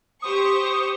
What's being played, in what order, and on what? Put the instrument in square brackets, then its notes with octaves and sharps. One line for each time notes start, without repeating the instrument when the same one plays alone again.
[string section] G4 C5 C#6 [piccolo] D#6